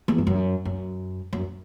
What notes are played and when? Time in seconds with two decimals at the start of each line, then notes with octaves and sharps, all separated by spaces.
0.08 E2
0.18 G2
0.27 F#2
0.65 F#2
1.33 F#2